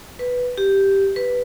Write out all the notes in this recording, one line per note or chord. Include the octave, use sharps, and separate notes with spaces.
B4
G4
B4